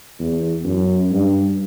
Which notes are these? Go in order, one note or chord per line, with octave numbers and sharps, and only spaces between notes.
E2
F#2
G2